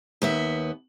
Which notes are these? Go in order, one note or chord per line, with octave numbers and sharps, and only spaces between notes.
D#2 B3 E5